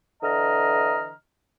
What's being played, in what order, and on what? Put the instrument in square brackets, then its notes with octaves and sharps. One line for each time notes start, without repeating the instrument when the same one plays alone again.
[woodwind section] D3 E3 D#5 A#5 F6